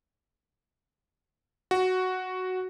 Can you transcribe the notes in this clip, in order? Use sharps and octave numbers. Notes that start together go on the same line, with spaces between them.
F#4